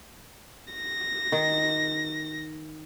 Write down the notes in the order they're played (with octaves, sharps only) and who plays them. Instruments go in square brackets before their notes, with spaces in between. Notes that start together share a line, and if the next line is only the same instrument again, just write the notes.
[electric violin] A#6
[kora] D#3